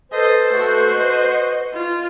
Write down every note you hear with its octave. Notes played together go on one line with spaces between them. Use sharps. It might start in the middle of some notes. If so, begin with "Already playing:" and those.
A4 B4 C5 D#5
A3 F#4
D#5
F4